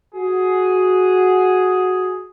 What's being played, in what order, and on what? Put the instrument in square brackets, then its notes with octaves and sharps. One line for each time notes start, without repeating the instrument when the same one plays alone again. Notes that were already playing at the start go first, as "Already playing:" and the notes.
[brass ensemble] F#4 G#4